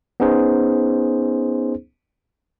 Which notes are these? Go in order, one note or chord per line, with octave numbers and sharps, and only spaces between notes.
B3 C#4 D#4 G#4 C5